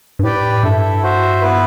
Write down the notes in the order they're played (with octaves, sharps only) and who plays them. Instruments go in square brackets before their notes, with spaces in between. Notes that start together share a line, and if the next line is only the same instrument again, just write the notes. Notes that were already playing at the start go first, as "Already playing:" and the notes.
[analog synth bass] G2
[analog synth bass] A2 [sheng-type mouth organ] G4 B4 D5 G5
[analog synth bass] G2 [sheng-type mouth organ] E4 A4 E5
[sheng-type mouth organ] F#4 C5 E5
B3 E4 B4